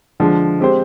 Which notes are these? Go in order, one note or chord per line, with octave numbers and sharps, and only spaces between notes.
D3 F3 G#3 D4
G#3 C4 G4 C5